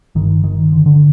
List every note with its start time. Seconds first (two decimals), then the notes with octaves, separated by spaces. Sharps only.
0.15 G1 D#3
0.43 G1 D#3
0.72 D3
0.86 D3